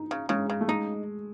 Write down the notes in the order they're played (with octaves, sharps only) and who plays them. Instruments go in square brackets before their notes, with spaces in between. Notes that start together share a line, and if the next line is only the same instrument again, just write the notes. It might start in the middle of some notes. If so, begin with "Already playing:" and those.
Already playing: [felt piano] D#4
[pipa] C#3
[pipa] C#3 [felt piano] G#3
[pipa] C#3
[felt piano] A3
[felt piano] G#3 [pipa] D#4